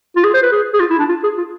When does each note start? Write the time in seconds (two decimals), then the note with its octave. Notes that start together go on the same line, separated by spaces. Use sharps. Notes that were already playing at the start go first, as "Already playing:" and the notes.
0.16 F4
0.24 G#4
0.34 C5
0.43 B4
0.52 G#4
0.73 G#4
0.80 F4
0.90 E4
0.99 D4
1.08 F4
1.23 G#4
1.38 F4